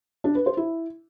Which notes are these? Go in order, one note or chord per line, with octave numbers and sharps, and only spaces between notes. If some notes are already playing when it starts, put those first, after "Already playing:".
D4
B4
C5
E4